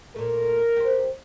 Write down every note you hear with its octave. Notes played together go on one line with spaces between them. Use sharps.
A#2 A3 A#4
G4 C5